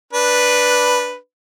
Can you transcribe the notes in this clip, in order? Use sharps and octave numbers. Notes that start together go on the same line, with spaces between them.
D4 B4